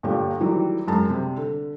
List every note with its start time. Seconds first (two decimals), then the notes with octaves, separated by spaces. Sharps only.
0.03 G1 A#2 D3 G4
0.40 D#3 E3 F#3 G3 A3
0.88 F#2 G#3 A5
1.10 C3 G3
1.37 D3